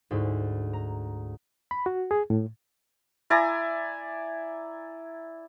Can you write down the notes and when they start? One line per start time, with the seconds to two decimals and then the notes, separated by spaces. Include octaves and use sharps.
0.11 D2 G#2 E4
0.73 A#5
1.71 B5
1.86 F#4
2.11 G#4
2.30 A2
3.30 E4 D5 G#5 A#5